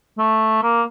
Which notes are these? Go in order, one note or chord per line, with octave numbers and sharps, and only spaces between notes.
A3
A#3